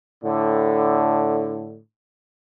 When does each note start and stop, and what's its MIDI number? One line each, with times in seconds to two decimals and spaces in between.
0.22 1.79 45
0.22 1.79 50